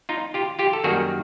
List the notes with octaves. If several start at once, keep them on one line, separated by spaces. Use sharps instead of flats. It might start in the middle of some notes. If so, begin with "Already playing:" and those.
D#4 F4
F4 G4
F4 G4
A4
F#2 D#3 G3 A#3 F#4 G#4